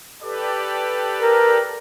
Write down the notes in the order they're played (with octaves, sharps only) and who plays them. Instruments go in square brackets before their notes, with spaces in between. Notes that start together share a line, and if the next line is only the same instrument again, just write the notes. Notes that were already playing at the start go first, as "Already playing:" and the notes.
[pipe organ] G4 A4 B4 [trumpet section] D5
[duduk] A#4